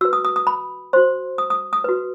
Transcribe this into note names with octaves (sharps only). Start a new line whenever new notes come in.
F#4 B4 E6
D#6
D#6
D#6
B5
F#4 C5 C6
D#6
D#6
D#6
F#4 B4